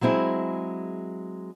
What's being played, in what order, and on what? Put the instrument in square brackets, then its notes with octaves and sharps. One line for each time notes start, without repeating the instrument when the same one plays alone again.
[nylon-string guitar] F#3 G#3 C4 E4 G#4